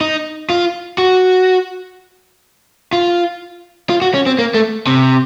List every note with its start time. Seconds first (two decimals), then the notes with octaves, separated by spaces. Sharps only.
0.01 D#4
0.50 F4
0.98 F#4
2.93 F4
3.89 F4
4.02 F#4
4.14 C#4
4.26 C4
4.39 A#3
4.54 A3
4.87 C3